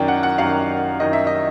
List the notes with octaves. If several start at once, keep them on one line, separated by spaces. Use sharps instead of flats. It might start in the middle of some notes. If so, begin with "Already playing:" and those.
Already playing: F#2 D#3 D5 G5
F#5
F#5
F#2 D#3 F5
F#2 D#3 D#5
E5
D#5